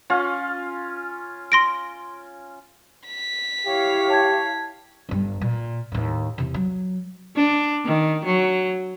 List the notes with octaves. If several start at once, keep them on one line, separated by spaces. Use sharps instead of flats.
C#4 F4
C6 A#6 D7
B6
E4 G4 C#5 F5
A5 G#6
G1 G2
A#2
D#2 A2
E2 C3
F#3
D4
D#3
F#3